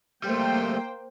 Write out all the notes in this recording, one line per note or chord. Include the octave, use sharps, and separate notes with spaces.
G3 A3 A#3 C5 G5